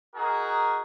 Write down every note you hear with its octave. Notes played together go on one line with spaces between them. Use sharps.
D#4 F#4 G#4 A#4